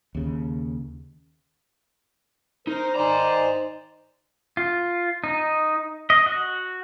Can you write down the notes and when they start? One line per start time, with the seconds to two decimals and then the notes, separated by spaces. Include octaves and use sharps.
0.15 D#2 C#3
2.67 D#4 A#4 C5
2.96 D#3 C5 D5 G#5 A#5
4.57 F4
5.24 D#4
6.10 D#5
6.26 F#4